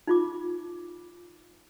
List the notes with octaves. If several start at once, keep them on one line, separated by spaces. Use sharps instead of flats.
D#4 F4 D6